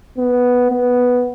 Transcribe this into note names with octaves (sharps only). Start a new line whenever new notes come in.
B3
B3